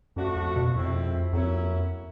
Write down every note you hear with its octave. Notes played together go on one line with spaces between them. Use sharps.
F#2 F3 A3 D4 F#4
F2
B2
F2 A2 F3 G#3 C4 E4
F2 F#3 A#3 C#4 E4